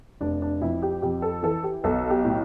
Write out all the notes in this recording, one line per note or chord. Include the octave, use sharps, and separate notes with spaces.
F1 D4
D4
F2 E4
G4
F2 G4
A4
E3 A4
G4
B1 A4
G4
A2